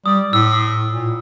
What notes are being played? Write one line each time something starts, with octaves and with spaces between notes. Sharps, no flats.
G3 D#6
A2 E6
A#2